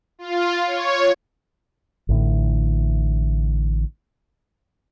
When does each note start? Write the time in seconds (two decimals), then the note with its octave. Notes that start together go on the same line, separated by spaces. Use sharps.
0.19 F4
0.67 C#5
2.09 A1 A2 D3